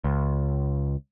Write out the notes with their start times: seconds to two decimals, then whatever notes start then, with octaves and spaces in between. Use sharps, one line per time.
0.04 C#2